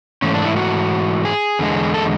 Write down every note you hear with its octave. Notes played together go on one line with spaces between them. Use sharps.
G#2 E3 A3 C#4
D4
E4
F#4
G#4
E2 D3 G#3
A4